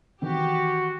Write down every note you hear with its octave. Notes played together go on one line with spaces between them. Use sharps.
D#3 E3 C4 F#4 G4